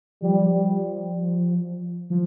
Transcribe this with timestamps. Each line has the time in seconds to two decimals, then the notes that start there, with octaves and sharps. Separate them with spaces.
0.22 F3 G3
0.53 G3
2.10 F3